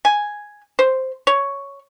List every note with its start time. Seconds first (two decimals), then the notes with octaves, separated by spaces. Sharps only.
0.05 G#5
0.79 C5
1.27 C#5